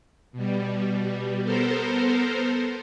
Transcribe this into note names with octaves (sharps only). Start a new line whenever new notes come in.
B2 G3
B3 A4 A#4 C5